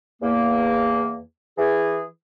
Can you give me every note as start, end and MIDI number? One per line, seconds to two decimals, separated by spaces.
0.22 1.19 40
0.22 1.19 58
1.58 2.04 52
1.58 2.04 68